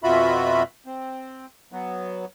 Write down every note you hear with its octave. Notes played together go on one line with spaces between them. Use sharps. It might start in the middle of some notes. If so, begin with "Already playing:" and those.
F2 B2 F4 F#4 E5 B5
C4
F#3 B3